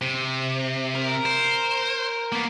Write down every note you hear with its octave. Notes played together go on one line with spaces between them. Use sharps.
C3
A#4
C5
A#3 B3